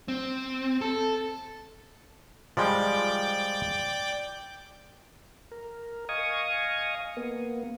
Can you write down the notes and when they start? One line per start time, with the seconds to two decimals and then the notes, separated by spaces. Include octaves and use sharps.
0.08 C4
0.81 A4
2.57 F3 G3 G#3 D5 G5 D6
5.52 A#4
6.09 D#5 F5 G#5 C#6 D#6
7.17 A#3 B3